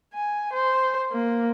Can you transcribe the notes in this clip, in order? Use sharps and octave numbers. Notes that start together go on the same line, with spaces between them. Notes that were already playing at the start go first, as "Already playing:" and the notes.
G#5
C5
A#3